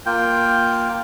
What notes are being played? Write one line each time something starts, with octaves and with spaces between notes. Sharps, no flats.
A#3 F4 G5